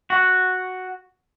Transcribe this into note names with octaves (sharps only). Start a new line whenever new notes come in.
F#4